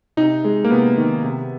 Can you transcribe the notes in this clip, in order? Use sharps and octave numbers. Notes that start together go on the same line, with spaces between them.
C3 D#4
G#3
A#3
C3 B3
D#3
C3